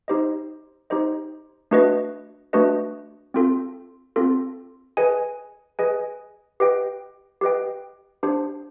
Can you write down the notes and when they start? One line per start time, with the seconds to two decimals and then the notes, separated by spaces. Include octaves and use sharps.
0.08 D#4 G4 C5 D#5
0.90 D#4 G4 C5 D#5
1.71 A3 D4 F#4 B4 D#5
2.53 A3 D4 F#4 B4 D#5
3.34 C4 F4 A4
4.16 C4 F4 A4
4.97 G#4 B4 D#5 G#5
5.79 G#4 B4 D#5 G#5
6.60 G4 B4 D#5 G5
7.41 G4 B4 D#5 G5
8.23 D4 G4 C5